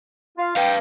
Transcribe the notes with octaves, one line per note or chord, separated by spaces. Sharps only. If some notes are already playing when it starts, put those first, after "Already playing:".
F4 F5
B4 F5 G5